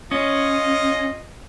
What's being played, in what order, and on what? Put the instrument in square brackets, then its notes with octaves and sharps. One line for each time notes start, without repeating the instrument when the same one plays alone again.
[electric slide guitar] C#4 [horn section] F4 D#5